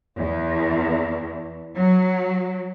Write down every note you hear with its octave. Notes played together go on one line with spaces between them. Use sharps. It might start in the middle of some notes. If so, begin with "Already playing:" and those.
E2
F#3